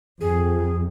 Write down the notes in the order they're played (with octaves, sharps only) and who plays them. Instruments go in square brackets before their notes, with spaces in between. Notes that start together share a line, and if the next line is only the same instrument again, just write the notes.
[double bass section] F2 [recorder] G#4